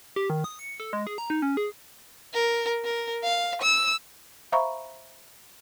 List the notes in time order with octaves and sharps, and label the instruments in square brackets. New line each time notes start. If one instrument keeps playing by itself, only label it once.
[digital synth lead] G4
D#3
D#6
C#7
A4
G#3
G#4
A#5
D#4
C#4
G#4
[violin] A#4
A#4
F5
E6
[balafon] C5 E5 F5 A#5 B5 C#6